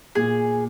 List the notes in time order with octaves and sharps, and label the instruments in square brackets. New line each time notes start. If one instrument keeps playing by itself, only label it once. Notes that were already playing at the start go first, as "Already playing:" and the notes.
[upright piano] A#2 [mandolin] G#4